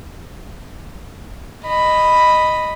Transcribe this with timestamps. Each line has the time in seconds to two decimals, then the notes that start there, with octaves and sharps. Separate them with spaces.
1.64 D#5 B5